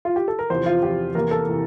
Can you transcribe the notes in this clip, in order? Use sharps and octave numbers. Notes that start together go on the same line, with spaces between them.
F4
G4
A4
A#4
E2 C3 F3 C5
F4
E2 C3 F3 G4
E2 C3 E3 A#3 A#4
A4
C3 E3